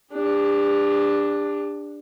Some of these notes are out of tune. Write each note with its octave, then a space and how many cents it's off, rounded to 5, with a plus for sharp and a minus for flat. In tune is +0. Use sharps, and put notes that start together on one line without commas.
D4 +0 G4 +40